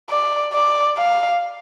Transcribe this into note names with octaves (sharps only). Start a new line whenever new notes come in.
D5
D5
F5